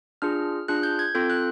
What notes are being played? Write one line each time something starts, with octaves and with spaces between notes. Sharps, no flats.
D4 F4 G#4 F6
D4 F4 G#4 F#6
G6
G#6
C4 F4 A4 G6
F#6